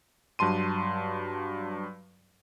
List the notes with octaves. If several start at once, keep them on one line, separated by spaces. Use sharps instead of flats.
G2 F#3 A5 C6 D#7